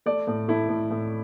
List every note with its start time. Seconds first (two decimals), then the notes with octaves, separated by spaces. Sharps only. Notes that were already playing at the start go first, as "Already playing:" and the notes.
0.06 A3 D5
0.27 A2
0.48 A3 E4
0.69 A2
0.91 A2